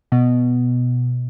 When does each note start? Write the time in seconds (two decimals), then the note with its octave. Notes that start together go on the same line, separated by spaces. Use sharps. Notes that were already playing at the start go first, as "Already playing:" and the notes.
0.12 B2